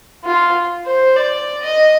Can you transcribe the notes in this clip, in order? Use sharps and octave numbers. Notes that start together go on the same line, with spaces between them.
F4
C5
D5
D#5